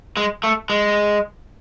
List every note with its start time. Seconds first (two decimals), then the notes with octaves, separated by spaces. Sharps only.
0.17 G#3
0.43 A3
0.70 G#3